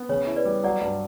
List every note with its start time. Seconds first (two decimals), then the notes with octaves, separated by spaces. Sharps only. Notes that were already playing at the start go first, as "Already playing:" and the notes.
Already playing: B3
0.09 C#3 C#5
0.27 E4
0.36 B4 D5
0.45 G3
0.64 F#3 D5 F#5
0.82 G2